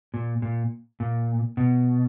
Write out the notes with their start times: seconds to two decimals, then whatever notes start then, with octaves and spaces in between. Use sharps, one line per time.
0.14 A#2
0.42 A#2
1.00 A#2
1.57 B2